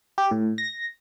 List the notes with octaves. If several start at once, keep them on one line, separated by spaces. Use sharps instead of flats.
G4
A2
A#6